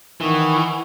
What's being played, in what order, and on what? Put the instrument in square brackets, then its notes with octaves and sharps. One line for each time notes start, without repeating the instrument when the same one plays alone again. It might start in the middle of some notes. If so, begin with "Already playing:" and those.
[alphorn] D#3 [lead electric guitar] E3 [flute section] F#5 C#6 D#6